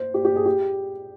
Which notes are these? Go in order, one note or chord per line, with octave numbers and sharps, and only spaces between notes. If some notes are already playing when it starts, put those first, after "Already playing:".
Already playing: C5
G4
G4
G#4
G4